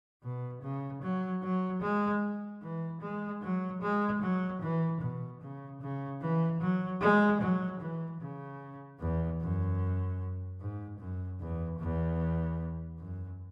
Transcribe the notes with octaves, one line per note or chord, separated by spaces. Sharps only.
B2
C#3
F#3
F#3
G#3
E3
G#3
F#3
G#3
F#3
E3
B2
C#3
C#3
E3
F#3
G#3
F#3
E3
C#3
E2
F#2
G#2
F#2
E2
E2
F#2